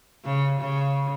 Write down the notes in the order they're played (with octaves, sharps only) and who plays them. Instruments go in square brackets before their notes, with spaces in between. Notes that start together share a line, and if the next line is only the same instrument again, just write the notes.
[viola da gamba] C#3
C#3